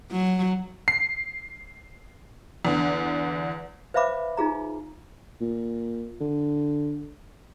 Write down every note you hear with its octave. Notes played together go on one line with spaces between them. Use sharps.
F#3
C7
E2 D3
B4 C5 E5 F5 B5 D6
D#4 F4 G#4 A#5
A#2
D3